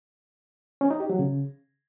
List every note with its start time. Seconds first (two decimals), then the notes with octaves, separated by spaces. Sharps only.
0.81 C#4
0.91 D#4
1.00 G4
1.10 F#3
1.19 C#3